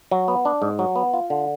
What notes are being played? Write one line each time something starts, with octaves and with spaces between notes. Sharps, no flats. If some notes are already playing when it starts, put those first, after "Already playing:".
F#3
B3
D4
G#2
F#3
B3
F4
D3